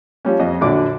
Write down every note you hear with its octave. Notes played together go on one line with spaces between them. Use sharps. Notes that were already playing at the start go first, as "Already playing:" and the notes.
F3 G3 C#4
F2 D#5
A#1 D3 F#3 D5 D6